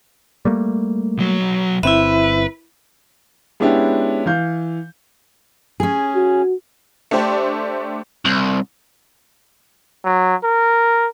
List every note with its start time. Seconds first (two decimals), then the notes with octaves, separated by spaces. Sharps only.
0.45 G3 A3 A#3
1.18 B1 F#3
1.83 G1 C4 E4 B4 E5
3.60 G#3 B3 C#4 D4 E4 G4
4.26 E3 F5 G6
5.80 C#4 G#4
6.16 F#4
7.11 A3 D4 G4 C5 D5
8.25 C2
10.05 F#3
10.44 A#4